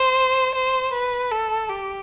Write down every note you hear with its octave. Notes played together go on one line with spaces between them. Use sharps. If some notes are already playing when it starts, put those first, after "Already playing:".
Already playing: C5
C5
B4
A4
G4